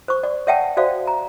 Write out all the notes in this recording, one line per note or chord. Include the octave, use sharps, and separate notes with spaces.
C5 C#6
D5
C#5 D5 E5 F#5 G5 A5
F#4 C5 D5 E5 F5
A#5